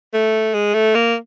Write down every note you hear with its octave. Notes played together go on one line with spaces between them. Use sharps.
A3
G#3
A3
A#3